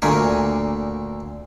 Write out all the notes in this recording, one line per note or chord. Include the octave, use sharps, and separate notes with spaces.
D2 A#2 D3 A3 A#4 G#5